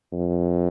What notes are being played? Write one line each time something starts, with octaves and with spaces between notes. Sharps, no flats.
F2